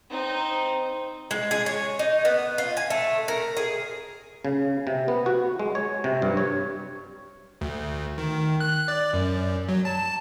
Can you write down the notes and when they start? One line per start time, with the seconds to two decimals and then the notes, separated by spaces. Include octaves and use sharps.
0.10 C4 D#4
1.31 G#3
1.51 G#4
1.66 C#5
1.99 D#4
2.25 B3
2.58 F4
2.77 G#5
2.90 A3
3.28 A#4
3.57 G#4
4.45 C#3
4.87 C3
5.08 B3
5.26 F#4
5.59 G#3
5.75 C#5
6.04 C3
6.22 G2
6.37 C#5
7.61 D2
8.18 D#3
8.60 F#6
8.88 D5
9.13 F#2
9.69 F#3
9.85 A5